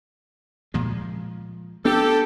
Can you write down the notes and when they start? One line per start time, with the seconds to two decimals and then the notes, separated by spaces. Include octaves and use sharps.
0.74 A#2 F3 G#3
1.85 B3 D4 G4 A4